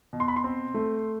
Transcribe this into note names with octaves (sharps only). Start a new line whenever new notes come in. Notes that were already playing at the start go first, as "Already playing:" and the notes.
B2
C6
B5
C6
C4
A3